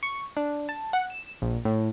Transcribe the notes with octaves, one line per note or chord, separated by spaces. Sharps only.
C#6
D4
A5
F#5
E7
A#1
A2